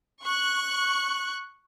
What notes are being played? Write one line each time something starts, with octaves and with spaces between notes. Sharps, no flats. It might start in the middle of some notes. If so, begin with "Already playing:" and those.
C#6 F#6